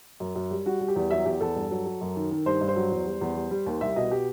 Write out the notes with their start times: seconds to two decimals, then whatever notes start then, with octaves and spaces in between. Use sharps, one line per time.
0.20 F#2
0.36 F#2
0.51 G3
0.66 G3 F#4
0.81 G3
0.88 G4
0.96 E2
1.11 F#3 E5
1.26 E2 G4
1.41 E2 A4
1.56 G2
1.71 F#3
1.86 F#3
2.01 F#2
2.16 D#3
2.31 D#3
2.46 G2 C5
2.61 G2
2.68 C5
2.76 F#3
2.91 E2
3.06 G3
3.21 E2
3.36 G3
3.51 G3
3.66 D#2
3.81 C2 E5
3.96 B2 D#5
4.11 G4